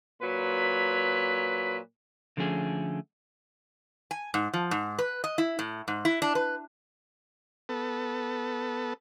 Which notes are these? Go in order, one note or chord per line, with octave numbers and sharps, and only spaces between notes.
A#2 F#3 B4 B5
D3 F3 A3 C#4 G#4
G#5
G#2
F3
G#2
B4
D#5
E4
A2
G#2
E4
D4
B4
B3 A4